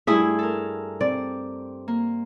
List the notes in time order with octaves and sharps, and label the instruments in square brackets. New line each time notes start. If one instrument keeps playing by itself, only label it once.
[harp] G2 A3 G#5 [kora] E4 G#4 E5
[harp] A4 A#4
[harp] C4 [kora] D5
[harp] A#3